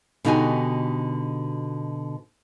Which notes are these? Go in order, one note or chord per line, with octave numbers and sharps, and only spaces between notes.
B2 D3 D#4 F#4 G4 G#5